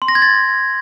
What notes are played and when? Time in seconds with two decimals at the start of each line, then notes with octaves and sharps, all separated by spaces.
0.02 C6
0.08 A#6
0.15 G#6
0.22 A6